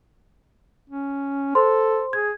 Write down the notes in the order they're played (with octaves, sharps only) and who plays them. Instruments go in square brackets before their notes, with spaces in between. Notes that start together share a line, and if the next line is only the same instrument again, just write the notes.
[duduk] C#4
[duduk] A4 [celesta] C5 C6
[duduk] G#4 [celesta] G#6